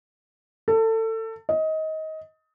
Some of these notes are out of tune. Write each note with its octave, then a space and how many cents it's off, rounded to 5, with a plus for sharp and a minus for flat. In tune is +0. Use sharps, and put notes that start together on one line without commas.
A4 +25
D#5 +20